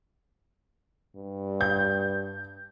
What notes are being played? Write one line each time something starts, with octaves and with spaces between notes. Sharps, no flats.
G2
G6